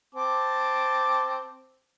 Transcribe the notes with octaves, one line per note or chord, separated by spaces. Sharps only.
C4 A5 D6